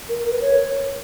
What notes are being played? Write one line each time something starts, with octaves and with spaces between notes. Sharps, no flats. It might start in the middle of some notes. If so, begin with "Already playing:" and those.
A#4
A#4
B4
C#5